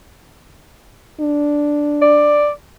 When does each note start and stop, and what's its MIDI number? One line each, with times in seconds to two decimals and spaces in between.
1.20 2.49 62
2.02 2.49 74